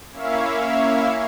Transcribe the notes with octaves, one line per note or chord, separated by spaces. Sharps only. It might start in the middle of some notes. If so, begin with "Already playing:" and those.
A#3 C#4 E4 C#5 E5 F5